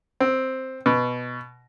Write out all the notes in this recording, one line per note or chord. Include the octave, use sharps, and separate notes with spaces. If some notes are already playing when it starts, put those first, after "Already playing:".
C4
B2